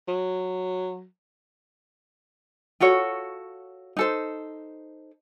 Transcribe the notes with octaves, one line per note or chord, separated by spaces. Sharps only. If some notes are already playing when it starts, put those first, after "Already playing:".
F#3
F4 F#4 A4 C#5
D#4 A4 C5